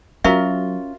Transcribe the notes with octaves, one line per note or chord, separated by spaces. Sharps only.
F#3 C#4 F4 F#4 A#4 E5 A#5